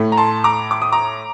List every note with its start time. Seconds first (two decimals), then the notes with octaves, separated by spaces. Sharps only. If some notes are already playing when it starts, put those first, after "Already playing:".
Already playing: A2 A3
0.12 A#5
0.17 A5 C6
0.44 A#5 D6
0.71 D6
0.82 D#6
0.92 A#5 D6